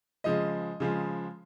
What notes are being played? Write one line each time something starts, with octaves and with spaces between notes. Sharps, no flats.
C#3 F3 G#3 D#5
C#3 F3 G#3